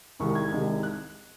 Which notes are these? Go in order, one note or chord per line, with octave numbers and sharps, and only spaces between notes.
C2 C3 D#3 G#3 C#6
G#6
C2 C3 D#3 G#3
F#6